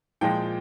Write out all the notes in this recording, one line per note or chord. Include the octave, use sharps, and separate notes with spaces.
A#2 F3 G#3 G5